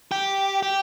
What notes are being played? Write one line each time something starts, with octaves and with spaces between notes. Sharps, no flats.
G4
G4